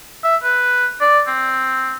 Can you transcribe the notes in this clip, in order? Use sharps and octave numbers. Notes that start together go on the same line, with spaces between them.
E5
B4
D5
C4